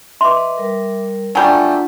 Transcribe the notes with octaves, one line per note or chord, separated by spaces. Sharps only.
B4 D#5 E5 C6 D6
G3 A#4
F#3 G3 A3 D4 F4 F#5 G#5 G6